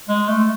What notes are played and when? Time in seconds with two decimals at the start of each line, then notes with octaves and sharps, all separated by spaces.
0.09 G#3
0.28 A3